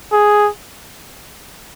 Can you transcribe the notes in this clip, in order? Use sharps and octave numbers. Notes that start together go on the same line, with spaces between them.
G#4